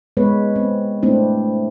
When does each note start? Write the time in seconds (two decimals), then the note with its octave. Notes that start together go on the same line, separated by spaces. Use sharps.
0.17 G#3 B3 B4 C#5
0.56 C4
1.03 A3 C4 D4 E4